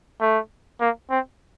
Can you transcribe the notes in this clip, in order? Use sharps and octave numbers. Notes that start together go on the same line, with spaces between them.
A3
A#3
C4